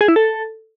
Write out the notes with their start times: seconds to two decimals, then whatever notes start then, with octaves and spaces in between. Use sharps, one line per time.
0.01 G#4
0.08 E4
0.16 A4